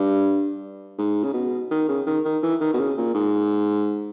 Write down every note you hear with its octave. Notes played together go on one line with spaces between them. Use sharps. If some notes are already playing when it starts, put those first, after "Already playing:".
Already playing: G2
G#2
C#3
B2
D#3
C#3
D#3
D#3
E3
D#3
B2
C#3
A#2
G#2